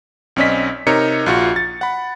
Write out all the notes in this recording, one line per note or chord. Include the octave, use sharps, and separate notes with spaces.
B1 C4 C#4 D5 D#5 B6
C3 D#4 A#4 C#5 C#7
A#1 F4 F#4 C#7
A6
F#5 B5